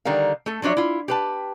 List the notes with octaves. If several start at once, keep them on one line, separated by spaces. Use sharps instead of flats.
D3 D#3 G3 A#4 F5
A3 A4
F3 F#3 D4 C#5 E5
E4 F4
G4 B4 A5